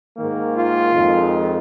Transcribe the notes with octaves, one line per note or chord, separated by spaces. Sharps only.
G#2 D#3 A#3
F4
F2 D#3 G#3